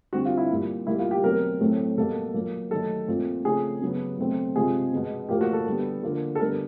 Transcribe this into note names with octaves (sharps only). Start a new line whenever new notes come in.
D3 G3 C4 F#4
F4
E4
A#2 G3 A#3
B2 G3 A#3 E4
F4
G4
B2 F#3 A3 C4 A#4
A2 F#3 A3 C4
B2 G3 A#3 A4
A#2 F#3 A#3
D#3 F#3 A3 A4
A#2 F3 A3 C4
C#3 F3 A3 C4 G#4
C#3 F#3 B3
B2 F#3 A3 C4
C3 F3 G#3 G#4
B2 G#3 B3
A2 F3 A#3 G4
F#4
A4
D3 G3 B3
D3 F3 A#3
A4
D3 G3 B3 A#4